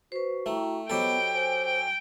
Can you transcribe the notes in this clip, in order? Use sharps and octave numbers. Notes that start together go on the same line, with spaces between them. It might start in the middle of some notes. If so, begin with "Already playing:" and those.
F#4 B4 C5
A3 E4 G5 A#5
F#3 B3 G4 A4 C5 D#5 G5 B5
C5 G#5
G5